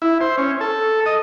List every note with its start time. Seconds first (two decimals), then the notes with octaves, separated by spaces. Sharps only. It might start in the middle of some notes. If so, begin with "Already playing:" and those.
0.02 E4
0.21 C5
0.38 C#4
0.61 A4
1.06 D#5